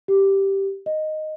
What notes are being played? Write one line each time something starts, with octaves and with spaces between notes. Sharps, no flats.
G4
D#5